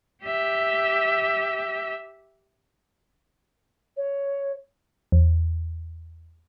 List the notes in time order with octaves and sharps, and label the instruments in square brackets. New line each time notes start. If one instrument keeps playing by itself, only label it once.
[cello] G4 E5
[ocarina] C#5
[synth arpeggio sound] E2